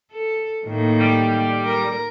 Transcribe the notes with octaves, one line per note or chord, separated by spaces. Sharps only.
A4
A2 D#3 A#3
G3
A#4